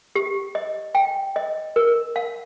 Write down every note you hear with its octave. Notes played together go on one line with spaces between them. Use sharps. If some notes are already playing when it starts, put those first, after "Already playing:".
G4
D#5
G5
D#5
A#4
F5